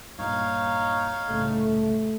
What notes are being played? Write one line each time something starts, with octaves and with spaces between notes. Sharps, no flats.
G2 A#2 D#4 C#5 F5
C2 A2 C#3 A3